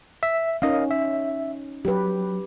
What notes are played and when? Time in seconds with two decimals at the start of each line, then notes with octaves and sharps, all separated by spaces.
0.23 E5
0.62 C#4 D#4 A#4 D#5 F5
0.91 E5
1.85 F#3 G4 B4